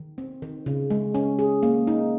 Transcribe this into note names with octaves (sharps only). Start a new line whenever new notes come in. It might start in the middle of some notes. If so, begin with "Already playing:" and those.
Already playing: D#3
C4
D#3
C#3
G#3
C#4
G#4
A#3
D#4